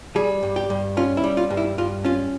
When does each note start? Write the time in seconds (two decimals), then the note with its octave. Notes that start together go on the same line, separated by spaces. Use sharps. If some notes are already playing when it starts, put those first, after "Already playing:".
0.16 G3 G#4
0.43 G2
0.56 G4
0.70 G2
0.97 C#4 F4
1.17 E4
1.24 G3
1.37 F4
1.51 G2
1.57 E4
1.78 G2 F4
2.05 C#4 F4